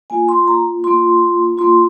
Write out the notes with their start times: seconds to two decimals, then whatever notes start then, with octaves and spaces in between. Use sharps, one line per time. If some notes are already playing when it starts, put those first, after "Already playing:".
0.10 A#3 F4 G#5
0.29 C6
0.48 A#5
0.84 A#3 F4 C6
1.58 A#3 F4 C6